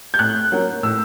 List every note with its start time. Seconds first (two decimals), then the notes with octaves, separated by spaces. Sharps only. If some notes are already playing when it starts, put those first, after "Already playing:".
0.14 G6
0.19 A2 F#6
0.52 F#3 A#3 C#4
0.83 A2 E6